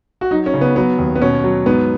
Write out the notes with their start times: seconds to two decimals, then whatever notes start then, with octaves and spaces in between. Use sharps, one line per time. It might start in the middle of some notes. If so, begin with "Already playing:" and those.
0.21 F#4
0.31 F#3 D#4
0.46 C#4
0.54 C#3
0.61 B3
0.76 F#3 B3
0.98 D#2
1.15 B3
1.21 B2 C#4
1.44 F#3
1.66 G#2 B3